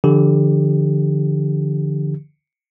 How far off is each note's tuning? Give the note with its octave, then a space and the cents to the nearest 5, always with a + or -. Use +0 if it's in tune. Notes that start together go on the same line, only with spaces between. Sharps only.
D3 +0 F3 -40 G4 +10